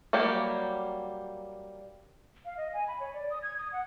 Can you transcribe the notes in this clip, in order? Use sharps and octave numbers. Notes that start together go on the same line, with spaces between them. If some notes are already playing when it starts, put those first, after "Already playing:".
F#3 G3 A#3 G4
F5
D#5
G#5
B5
C#5
D5
D#6
G#6
D#6
F#5